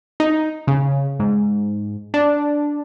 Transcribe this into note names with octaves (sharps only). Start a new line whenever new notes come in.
D#4
C#3
G#2
D4